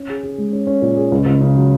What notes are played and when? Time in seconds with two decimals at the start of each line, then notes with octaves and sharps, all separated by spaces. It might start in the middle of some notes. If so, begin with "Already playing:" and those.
Already playing: C#4
0.09 G#4
0.23 G#4
0.38 G#3
0.52 C#4
0.67 C#4
0.82 A#2
0.97 G#4
1.12 C#2
1.26 C#2
1.41 C#3
1.56 F#3